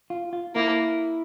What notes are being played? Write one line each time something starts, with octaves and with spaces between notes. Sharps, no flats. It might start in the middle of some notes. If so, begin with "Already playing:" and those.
F4
F4
A#3 E4